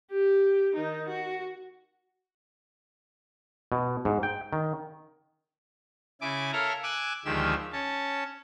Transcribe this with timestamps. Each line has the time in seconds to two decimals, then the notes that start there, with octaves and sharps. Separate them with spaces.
0.12 G4
0.75 D#3 D#4
1.08 F#4
3.72 B2
4.05 G#2
4.23 G5
4.53 D#3
6.21 C#3 E4 G#5 D6
6.52 A4 A#4 C#5 E5 F5 A#5
6.83 G#5 D6 E6 F#6
7.25 D2 D#3 F3 G#3 G4 E6
7.72 C#4 A5